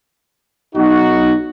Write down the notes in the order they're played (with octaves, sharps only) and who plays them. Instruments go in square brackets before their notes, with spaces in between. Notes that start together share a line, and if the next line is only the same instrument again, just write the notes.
[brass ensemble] B1 D#4 F#4